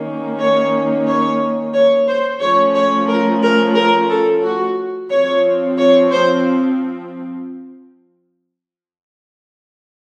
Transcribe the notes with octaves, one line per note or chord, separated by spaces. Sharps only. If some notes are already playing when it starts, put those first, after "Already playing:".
Already playing: D#3 A#3 C#4
C#5
C#5
C#5
C5
F3 A3 C#4 C#5
C#5
A#4
A#4
A#4
A4
F#4
F3 C4 C#5
C#5
C5